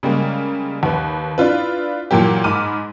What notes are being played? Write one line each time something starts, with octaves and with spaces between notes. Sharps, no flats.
C#3 G3 G#3 A#3
D#2 B4
D4 E4 F4 B4
A#2 E3 F#3 A#3 G4
G#2 B5 D6 E6 F6 D#7